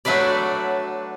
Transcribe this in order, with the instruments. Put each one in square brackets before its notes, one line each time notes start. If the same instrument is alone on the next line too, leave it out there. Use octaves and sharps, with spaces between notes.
[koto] F#3 A3 D4 B4 D5